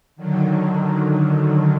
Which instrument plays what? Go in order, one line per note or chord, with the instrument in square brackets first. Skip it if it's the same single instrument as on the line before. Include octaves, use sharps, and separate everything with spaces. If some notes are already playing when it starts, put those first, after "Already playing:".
[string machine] D3 D#3 F#3